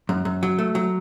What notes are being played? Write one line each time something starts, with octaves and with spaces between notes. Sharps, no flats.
F#2
F#2
F#3
A3
F#3